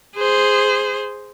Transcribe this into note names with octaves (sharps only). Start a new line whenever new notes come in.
G#4 C5